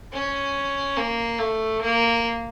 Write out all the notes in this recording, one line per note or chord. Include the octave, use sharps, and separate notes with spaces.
C#4
A#3
A3
A#3